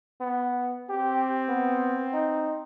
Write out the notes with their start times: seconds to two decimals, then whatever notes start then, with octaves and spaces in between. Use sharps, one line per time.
0.20 B3
0.89 C4 G4
1.49 B3
2.13 D#4